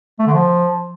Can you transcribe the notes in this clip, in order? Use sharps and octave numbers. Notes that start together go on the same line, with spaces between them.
A3
D3
F3